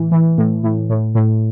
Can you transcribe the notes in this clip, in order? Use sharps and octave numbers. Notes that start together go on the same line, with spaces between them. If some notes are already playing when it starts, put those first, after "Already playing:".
Already playing: A2 E3
E3
A2
A2
A2
A2